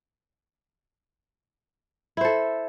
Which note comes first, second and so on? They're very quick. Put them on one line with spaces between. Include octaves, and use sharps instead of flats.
E4 C5 A4